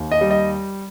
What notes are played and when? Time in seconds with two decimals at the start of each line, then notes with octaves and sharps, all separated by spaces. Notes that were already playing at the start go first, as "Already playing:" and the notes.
Already playing: D#2
0.11 D#5
0.21 G3
0.31 D#5